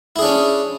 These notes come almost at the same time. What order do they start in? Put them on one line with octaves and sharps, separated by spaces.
E4 G#4 D4 C#4